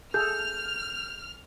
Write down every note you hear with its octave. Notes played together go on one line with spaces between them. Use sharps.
G#4 A4 F6 G6